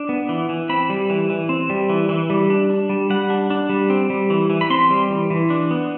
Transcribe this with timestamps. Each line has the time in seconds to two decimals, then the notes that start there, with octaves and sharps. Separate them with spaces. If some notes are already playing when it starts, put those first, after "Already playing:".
Already playing: D4
0.09 B3
0.29 E3
0.49 E3
0.69 C4 B5
0.89 G3
1.10 E3
1.30 E3
1.49 C4
1.70 G3
1.89 E3
2.09 E3
2.30 G3
2.50 D4
2.70 D4
2.89 G3
3.10 G3 F#5
3.30 D4
3.50 D4
3.70 G3
3.90 C4
4.10 G3
4.30 E3
4.50 E3
4.61 B5
4.70 C4 C6
4.90 G3
5.10 E3
5.30 E3
5.50 D4
5.71 B3